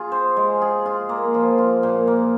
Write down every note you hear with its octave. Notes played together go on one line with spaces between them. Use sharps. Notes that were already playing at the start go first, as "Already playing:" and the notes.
Already playing: F4 G#4
C5
G#3
G#4
F4
A#3
F3
F4
A#2
A#3